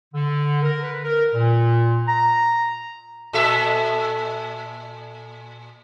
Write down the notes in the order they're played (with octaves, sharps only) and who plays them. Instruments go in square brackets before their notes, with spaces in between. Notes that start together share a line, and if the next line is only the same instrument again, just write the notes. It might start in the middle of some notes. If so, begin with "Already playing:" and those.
[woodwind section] D3
A#4
B4
A#4
A#2
A#5
[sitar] A#2 A4 E5